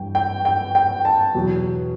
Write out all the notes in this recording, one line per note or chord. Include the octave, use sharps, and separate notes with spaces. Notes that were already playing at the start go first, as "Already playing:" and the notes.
Already playing: G2 E3 G3 G5
G5
G5
G5
A5
E2 B2 F#3